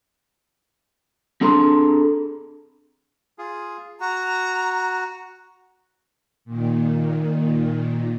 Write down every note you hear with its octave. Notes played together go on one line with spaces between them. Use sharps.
C4 D4 G#4 A4 A#5 C6
F4 G#4
F#4 A#5
A#2 D#3